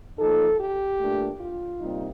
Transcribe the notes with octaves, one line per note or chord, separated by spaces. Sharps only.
F3 A#3 D#4 A4
G4
A#2 A3 D4
F4
C3 G3 A#3 D#4